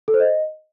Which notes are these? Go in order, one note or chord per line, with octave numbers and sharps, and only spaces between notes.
A4
C5
D#5